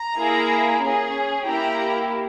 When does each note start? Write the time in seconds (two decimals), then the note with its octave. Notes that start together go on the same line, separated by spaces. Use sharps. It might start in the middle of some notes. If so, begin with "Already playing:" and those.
Already playing: A#5
0.17 A#3 E4 G#4
0.81 C#4 G#4
1.46 A#3 E4 G4 A#5